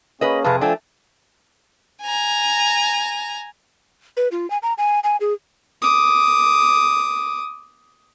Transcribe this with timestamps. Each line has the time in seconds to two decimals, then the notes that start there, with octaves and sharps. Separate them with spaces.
0.21 A#3 C#4 G#4 B4 D#5
0.44 F2 C3 G#4 B4 F5 A5
0.61 F3 A3 D4 G5 G#5
2.02 G#5 A#5
4.17 B4
4.32 F4
4.50 G#5
4.63 A#5
4.78 G#5
5.04 G#5
5.21 G#4
5.82 D6 D#6